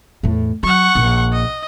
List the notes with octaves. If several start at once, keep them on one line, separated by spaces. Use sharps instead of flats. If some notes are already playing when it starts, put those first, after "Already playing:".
E2 A2
F#3 F#5 C#6
A#1
D#5